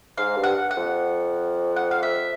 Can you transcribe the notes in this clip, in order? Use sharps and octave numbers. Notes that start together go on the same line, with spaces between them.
G#2 F5
G2
F#5
F#5
F2
F#5
F5
E5